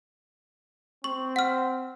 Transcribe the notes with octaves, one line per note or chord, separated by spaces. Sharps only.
C4 C#6
F#5 F6